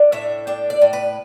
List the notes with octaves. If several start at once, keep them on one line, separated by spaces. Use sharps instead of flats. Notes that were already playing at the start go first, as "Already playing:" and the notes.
Already playing: D4
A2 E5
D4 G5
D5
A2
B4